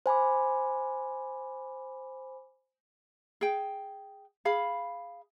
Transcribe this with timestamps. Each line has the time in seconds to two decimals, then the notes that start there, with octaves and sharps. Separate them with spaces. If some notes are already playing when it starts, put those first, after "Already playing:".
0.06 C5 G#5 B5 D6
3.41 G#4 G5
4.45 G#4 F5 B5